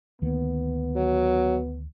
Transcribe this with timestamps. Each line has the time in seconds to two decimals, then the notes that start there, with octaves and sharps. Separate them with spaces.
0.22 D2 D#3 A#3 B3
0.96 F#3